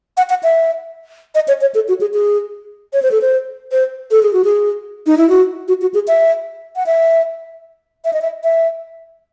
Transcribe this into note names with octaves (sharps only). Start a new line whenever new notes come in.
F#5
F#5
E5
D#5
C#5
C#5
A4
F#4
G#4
G#4
C#5
C5
A4
C5
C5
A4
G#4
F#4
G#4
D#4
E4
F#4
F#4
F#4
G#4
E5
F#5
E5
E5
D#5
E5
E5